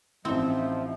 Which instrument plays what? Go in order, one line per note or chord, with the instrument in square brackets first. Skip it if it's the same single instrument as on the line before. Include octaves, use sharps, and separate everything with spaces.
[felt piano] A1 E4 [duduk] F3 [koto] C4 D#4 [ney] E5